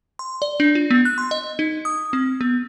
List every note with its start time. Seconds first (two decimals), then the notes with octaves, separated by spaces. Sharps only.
0.19 C6
0.42 D5
0.60 D4
0.75 F4
0.91 B3
1.05 F#6
1.18 C6
1.31 D#5
1.59 D#4
1.85 D#6
2.13 C4
2.41 B3